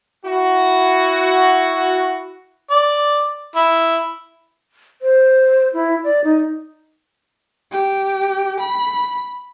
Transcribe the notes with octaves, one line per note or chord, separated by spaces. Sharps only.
E4 F#4
D5
E4
C5
E4
D5
D#4
G4
B5